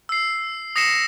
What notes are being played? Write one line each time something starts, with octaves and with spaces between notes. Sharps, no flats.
E6 C7
D#6 A#6 C7 C#7 E7